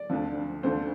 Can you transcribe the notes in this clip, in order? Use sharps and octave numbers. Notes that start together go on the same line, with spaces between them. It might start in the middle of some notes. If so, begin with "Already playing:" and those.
Already playing: D5
D2 D3 F3
D2 D3 F3 C5